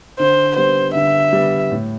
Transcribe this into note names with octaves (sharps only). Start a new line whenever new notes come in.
D3 C5
G3 B3 C5
D3 E5
G3 B3
A2